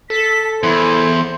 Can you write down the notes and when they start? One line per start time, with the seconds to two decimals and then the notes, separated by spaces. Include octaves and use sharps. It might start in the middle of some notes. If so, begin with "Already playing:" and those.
0.10 A4 B6
0.63 E2 E4 C5